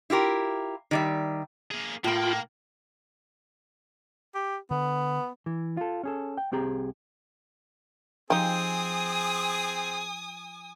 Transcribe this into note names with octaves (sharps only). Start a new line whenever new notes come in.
E4 F4 G4 A#4
D#3 G3 E5
A#3 G#4
A2 A#3 F4 A#4 G5 B5
G4
D3 B3
E3
F4 A4
C#4 G#4 A4
G5
C2 C4 G4 G#4 A#5
F3 C4 D#4 G4 G#4 G#5 D#6 G6